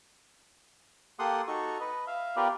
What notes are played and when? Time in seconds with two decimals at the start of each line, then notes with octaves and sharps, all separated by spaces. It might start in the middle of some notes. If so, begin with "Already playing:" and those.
1.19 A#3 G4 A4 F#5 C6 D#6
1.48 D#4 F#4 A4 C#6
1.80 B4 D#5
2.07 E5 F5
2.36 B3 F4 G4 A#4 B4 D5